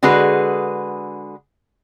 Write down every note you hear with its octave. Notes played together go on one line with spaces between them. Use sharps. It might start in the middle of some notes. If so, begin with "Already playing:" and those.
D3 G#3 F#4 G#4 B4